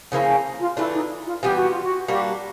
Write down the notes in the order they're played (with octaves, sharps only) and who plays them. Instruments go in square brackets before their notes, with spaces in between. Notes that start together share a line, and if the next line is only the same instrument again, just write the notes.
[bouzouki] C#3 F3 A#3 C#4 [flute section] E4
[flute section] F4
[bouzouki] E3 A3 D4 [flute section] E4
[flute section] D#4
F4
[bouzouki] E3 G3 B3 E4 [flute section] G4
[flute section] F#4
F4
F#4
[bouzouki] G3 A#3 D4 F#4 [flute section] G4